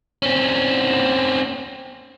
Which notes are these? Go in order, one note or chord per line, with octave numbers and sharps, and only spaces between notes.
C4 C#4